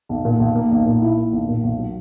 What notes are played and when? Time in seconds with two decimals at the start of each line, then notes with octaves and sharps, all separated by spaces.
0.09 B1
0.25 A#2
0.40 B1
0.56 A#3
0.71 B1
0.86 A#2
1.02 E4
1.17 A#3
1.32 B1
1.49 A#2
1.63 B1
1.79 F#3